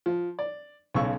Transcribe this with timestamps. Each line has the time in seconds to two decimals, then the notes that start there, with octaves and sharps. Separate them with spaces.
0.06 F3
0.39 D5
0.95 B1 C#3 C#6 E6